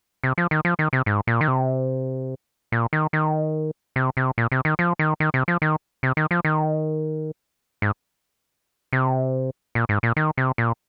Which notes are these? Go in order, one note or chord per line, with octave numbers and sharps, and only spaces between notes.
C3
F3
D#3
F3
D#3
C3
G#2
A#2
D#3
C3
A#2
D#3
D#3
C3
C3
A#2
C3
D#3
F3
D#3
D#3
C3
F3
D#3
C3
D#3
F3
D#3
G#2
C3
A#2
G#2
A#2
D#3
C3
A#2